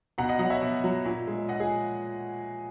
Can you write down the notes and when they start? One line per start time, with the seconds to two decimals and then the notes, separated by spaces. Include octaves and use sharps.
0.18 B2 F#5 A#5
0.29 D#5 F#5
0.39 F#3 D#5 F#5
0.50 C#5 E5
0.62 B2
0.84 F#3
1.05 A#2
1.28 G#3
1.49 A#2 D#5 F#5
1.60 G#4